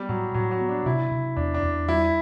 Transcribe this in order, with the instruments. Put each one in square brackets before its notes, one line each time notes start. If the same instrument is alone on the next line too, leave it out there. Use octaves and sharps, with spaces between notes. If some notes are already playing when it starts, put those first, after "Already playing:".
Already playing: [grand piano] G3 [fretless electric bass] B3
[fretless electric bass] A2 [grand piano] F#3
[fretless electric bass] A2 [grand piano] F#3
[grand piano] F#3
[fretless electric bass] B3
[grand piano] D4
[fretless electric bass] C3 [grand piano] E4
[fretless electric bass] C3
[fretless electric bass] E2 [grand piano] D4
[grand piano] D4
[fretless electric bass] E2
[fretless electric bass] G3 [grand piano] E4